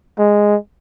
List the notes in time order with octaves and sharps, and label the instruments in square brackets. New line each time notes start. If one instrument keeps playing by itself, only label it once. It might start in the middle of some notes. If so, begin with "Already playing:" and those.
[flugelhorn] G#3